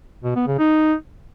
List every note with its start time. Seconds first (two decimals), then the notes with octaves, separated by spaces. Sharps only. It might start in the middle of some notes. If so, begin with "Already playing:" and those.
0.24 B2
0.36 B3
0.47 C#3
0.59 D#4